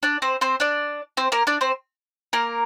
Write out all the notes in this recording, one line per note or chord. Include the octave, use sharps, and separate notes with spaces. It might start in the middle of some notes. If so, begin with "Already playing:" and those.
D4 D5
C4 C5
C4 C5
D4 D5
C4 C5
A#3 A#4
D4 D5
C4 C5
A#3 A#4